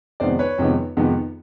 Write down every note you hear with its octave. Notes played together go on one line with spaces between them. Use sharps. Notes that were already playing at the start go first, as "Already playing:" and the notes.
F2 C3 D#3 G#3 B3 C5 D5
B4 C#5
F2 C3 D#3 G#3 B3
F2 C3 D#3 G#3 B3